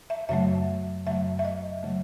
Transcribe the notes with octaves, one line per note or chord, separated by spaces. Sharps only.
E5
F#2 C#3 F#3 A3 E5
F#2 C#3 F#3 A3 E5
E5
D#5
C#3 F#3 A3